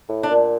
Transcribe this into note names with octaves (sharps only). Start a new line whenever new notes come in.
A2
D4
A#2